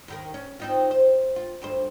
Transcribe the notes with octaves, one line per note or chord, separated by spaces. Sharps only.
D#2 D#3 A#4
C#4
C4 D#4 F4
C5
F4
D2 G2 C5